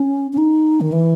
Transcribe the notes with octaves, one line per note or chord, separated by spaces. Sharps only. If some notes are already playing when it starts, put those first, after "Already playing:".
Already playing: C#4
C#4
D#4
D#3
E3